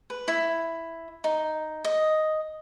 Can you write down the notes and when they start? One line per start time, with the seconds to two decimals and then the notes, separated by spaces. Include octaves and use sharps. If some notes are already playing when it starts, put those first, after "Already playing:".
0.10 B4
0.28 E4
1.24 D#4
1.84 D#5